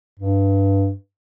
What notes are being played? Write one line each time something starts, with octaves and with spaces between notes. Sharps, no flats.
G2